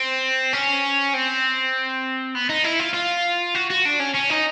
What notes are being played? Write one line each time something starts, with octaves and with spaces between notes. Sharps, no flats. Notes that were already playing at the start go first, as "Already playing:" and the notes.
Already playing: C4
C#4
C4
B3
D#4
E4
F4
F4
F#4
F#4
D4
C#4
C#4
D#4